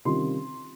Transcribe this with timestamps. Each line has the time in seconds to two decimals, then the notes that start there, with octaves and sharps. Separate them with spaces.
0.05 C3 D#3 G3 C#4 F4 C6